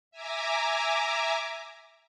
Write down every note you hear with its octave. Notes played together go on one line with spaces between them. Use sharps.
E5 G#5 A#5 D6